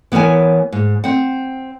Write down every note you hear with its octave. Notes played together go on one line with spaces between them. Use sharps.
E3 B3 A#4 C#5 G#5
G#2
C4 F#5